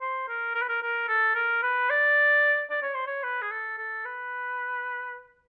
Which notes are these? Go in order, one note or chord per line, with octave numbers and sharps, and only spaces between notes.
C5
A#4
A#4
B4
A#4
A#4
A4
A#4
B4
D5
D5
C#5
C5
C#5
B4
G#4
A4
A4
B4